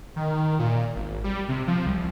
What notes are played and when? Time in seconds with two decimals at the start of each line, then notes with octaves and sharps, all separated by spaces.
0.16 D#3
0.59 A#2
0.96 G#1
1.24 G3
1.49 C3
1.67 F3
1.86 C2